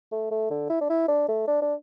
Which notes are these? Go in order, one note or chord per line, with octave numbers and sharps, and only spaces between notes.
A3
A3
D3
E4
D4
E4
D4
A3
D4
D4